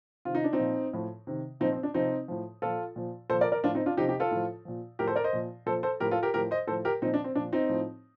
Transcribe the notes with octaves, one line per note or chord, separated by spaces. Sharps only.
C3 D#3 F4
D#4
D4
C4 D#4
A#2 F3
A2 F3
C3 D#3
A#2 F3 C4 D#4
C4
D4
C3 F3 C4 D#4
A2 F3
A#2 F3 F4 A4
A#2 F3
A#2 F3 A4 C5
A#4 D5
A#4 D5
A2 F3 D4 F4
C4 D#4
D4 F4
C3 F3 D#4 G4
D#4 G4
F4 A4
A2 F3
A#2 F3
A2 F3 G4 A#4
A4 C5
A#4 D5
C5 D#5
A#2 F3
A#2 F3 A4 C5
A4 C5
A2 F3 G4 A#4
F4 A4
G4 A#4
A2 F3 G4 A#4
C5 D#5
A2 F3 A4 C5
G4 A#4
A#2 F3 C4 D#4
D4
C4
A#2 F3 D4
C4 D#4
A2 F3